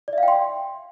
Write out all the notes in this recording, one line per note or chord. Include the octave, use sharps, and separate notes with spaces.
D5
E5
F5
G5
C6